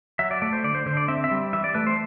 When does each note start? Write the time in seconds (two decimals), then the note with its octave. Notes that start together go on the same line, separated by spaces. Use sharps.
0.19 F#3 E5
0.31 D5
0.42 A3 D5
0.53 C5
0.64 D3 D5
0.75 C5
0.86 D3 C5
0.97 D5
1.08 C4 E5
1.24 E5
1.31 G3
1.53 E3 E5
1.64 D5
1.75 A3 B4
1.87 C5